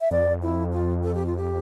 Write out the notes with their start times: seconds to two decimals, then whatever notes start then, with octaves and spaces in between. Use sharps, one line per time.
0.01 E5
0.11 F2 D5
0.43 E4
0.72 F4
1.03 A4
1.15 G4
1.26 F4
1.37 G4